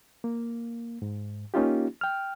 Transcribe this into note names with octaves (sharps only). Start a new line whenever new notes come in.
A#3
G#2
A#3 C#4 D#4 F4 G4
G5 F6